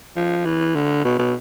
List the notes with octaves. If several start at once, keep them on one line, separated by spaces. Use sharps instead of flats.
F3
E3
D3
B2
B2